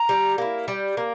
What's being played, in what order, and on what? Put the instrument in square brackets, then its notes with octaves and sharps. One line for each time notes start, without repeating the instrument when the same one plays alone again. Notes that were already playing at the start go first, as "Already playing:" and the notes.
Already playing: [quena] A#5
[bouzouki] G3
A#3 E4
G3
A#3